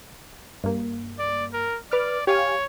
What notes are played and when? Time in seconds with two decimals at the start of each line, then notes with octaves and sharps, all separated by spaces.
0.64 G2 A#3
1.19 D5
1.53 A#4
1.91 B4 D5 D6 F6
2.27 G4 C#5 F5 G#5